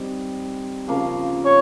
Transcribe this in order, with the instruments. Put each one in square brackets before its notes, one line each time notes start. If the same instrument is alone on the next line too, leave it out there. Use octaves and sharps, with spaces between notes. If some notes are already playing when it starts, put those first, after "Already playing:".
Already playing: [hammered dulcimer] G3 C4 D#4
C#3 F3 A#3
[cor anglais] C#5